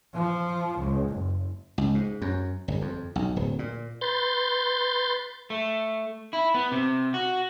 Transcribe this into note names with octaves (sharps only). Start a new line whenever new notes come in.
F3
C#2
F#1
C#2
G#2
F#2
G1
F2
B1
D1
A#2
B4 C6 G6 A6
A3
E4
B3
C3
F#4